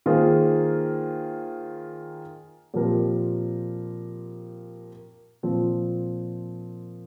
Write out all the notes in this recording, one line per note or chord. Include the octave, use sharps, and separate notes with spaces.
D#3 A#3 F4 G#4 C5
A#2 F3 C4 G4 A#4
A#2 F3 C4